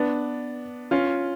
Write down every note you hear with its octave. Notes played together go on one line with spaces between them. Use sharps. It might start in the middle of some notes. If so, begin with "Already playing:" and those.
Already playing: B3 D4
C#4 F4